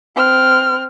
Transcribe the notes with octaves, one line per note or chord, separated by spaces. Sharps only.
C4 F6